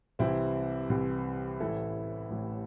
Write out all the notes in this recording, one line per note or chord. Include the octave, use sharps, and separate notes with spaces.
C2 C3 E3 C4 E4
C2 C3 E3
A1 A2 E3 E4 A4
A1 A2 E3